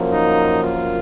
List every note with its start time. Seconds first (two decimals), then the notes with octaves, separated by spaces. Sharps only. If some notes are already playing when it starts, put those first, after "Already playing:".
Already playing: F#2 F3 A#3
0.12 D#4
0.63 F4